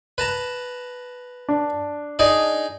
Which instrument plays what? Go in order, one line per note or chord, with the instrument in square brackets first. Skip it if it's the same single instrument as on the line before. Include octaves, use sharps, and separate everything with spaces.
[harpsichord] B4 A5 A#5
[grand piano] D4
[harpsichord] D#4 G#4 D5